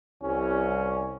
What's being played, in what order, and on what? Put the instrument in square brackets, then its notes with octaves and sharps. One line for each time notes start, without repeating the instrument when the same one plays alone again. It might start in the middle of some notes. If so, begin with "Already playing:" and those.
[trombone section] C2 [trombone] C#4